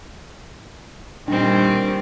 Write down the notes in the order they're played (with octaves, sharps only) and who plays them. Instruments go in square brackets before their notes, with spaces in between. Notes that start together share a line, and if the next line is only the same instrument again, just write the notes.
[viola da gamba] A#2 G3 [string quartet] D#3 C4 [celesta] D4